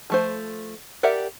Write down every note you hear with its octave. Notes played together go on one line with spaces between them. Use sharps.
F3 A3 C5
G4 A#4 D5 E5 F#5